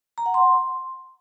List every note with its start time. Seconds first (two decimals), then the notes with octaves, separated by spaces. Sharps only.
0.18 A#5
0.26 F#5
0.34 C6